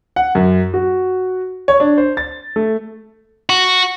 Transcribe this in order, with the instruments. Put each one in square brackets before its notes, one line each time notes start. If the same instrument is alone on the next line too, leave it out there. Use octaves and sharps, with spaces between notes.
[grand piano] F#5
F#2
F#4
C#5
D4
C5
A6
A3
[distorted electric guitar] F#4